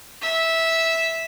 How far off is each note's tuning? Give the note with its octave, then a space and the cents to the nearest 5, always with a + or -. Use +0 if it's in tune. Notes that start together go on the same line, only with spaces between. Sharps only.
E5 -10